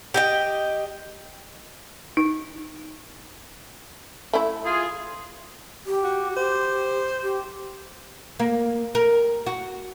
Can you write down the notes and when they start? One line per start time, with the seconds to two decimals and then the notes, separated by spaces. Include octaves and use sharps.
0.14 G4 D#5 G5
2.17 D#4
4.33 A3 E4
4.65 F4 G#4
5.86 G4
6.04 F#4
6.36 G4 C5
7.23 G4
8.39 A#3
8.95 A#4
9.46 F#4